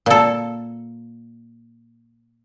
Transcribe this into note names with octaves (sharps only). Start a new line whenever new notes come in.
A#2 A4